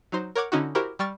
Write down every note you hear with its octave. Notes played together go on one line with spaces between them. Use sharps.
F#3 D#4 C5
A#4 C#5 F#5 D6 G#6
D3 C#4 D#4 E4 F#4
E4 F#4 G4 A#4 C5
G3 G5 C#6 F6 A6